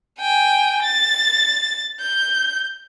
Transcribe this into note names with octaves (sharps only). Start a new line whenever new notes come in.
G5 G#5
A6
G6